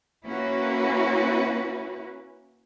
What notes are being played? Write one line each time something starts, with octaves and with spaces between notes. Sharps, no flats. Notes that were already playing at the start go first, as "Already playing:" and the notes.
A#3 C#4 E4 F#4 B4